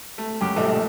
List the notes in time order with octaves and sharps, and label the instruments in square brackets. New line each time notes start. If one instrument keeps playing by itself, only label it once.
[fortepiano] A3
[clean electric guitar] C#2 G4 [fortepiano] F#2
[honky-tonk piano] A#1 D#5 [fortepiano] G3 A3 A4